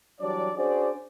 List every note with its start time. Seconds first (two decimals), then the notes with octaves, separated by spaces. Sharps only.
0.20 E3 F#3 G3 D4 C#5 D5
0.56 C#4 D4 F#4 G#4 C5 D5